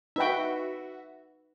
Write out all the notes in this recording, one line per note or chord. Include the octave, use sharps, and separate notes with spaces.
D#4 F#4 B4 E5 G5